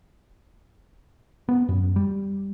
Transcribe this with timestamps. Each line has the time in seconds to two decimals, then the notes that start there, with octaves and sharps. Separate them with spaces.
1.49 B3
1.69 F#2
1.96 G3